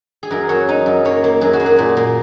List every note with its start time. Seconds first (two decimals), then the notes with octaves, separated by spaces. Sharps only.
0.23 G#4
0.31 F#2 A#4
0.49 F#3 C#5
0.69 D#4
0.86 F#2
1.05 A#3 C#5
1.24 A#3
1.41 F#2 G#4
1.53 F#4
1.60 A#3
1.66 G#4
1.79 A#2
1.97 A#3